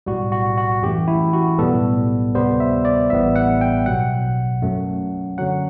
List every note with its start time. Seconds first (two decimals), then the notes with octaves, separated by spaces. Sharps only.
0.06 B1 A2 G3 F#4
0.32 F#4
0.58 F#4
0.82 F#2 E3 A3 G4
1.08 E4
1.33 F#4
1.58 B1 A2 G3 B3 A4
2.35 D2 C3 G3 B3 C5
2.60 E5
2.85 D5
3.10 A1 A2 G3 B3 E5
3.36 F#5
3.61 G5
3.86 B1 B2 F#3 F#5
4.62 F#2 F#3 A3
5.38 F#2 D3 F#3 F#5